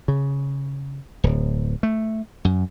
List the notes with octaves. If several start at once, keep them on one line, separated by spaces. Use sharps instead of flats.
C#3
D1
A3
F#2